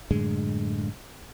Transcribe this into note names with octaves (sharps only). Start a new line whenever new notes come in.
F#2 A2 D3 G#3